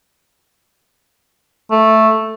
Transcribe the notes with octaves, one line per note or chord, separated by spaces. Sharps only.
A3